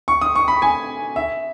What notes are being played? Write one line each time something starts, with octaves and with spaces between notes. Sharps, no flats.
C#6
D#6
C#6
B5
G#5
E5